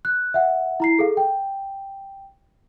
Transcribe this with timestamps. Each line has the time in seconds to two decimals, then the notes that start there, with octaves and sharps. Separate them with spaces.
0.05 F#6
0.34 E5 F#5
0.80 E4 A#5 C7
0.99 G#4 A4 F5
1.17 G5